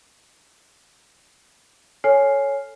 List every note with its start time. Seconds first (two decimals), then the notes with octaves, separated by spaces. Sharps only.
2.04 A4 C#5 G#5 F6 C7